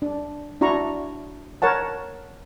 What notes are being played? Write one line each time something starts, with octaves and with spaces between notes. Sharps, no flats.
D4
D4 E4 F#4 A#5 C#6
A#4 C#5 F#5 A5